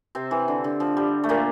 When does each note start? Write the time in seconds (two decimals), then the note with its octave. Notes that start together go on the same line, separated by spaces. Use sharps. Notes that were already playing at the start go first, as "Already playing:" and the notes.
0.15 C3 C4
0.31 E3
0.48 D3
0.64 D3
0.80 F3
0.97 G3
1.24 A3
1.29 A#2 A#3